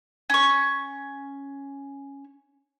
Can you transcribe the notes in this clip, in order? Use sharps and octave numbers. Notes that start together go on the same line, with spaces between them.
C#4 C#6